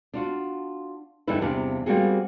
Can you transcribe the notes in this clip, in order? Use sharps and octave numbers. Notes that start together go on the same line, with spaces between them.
D4 F4 F#4
E2 G2 D3 D#4 E4 B4
E2 C3 G3 D4 F5
G3 A#3 C4 F#4 G#4